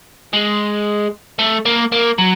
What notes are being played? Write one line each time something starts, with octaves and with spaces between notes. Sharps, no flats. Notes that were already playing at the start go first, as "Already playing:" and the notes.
G#3
A3
A#3
A#3
F#3